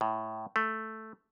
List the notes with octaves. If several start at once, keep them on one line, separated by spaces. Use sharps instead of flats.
A2
A3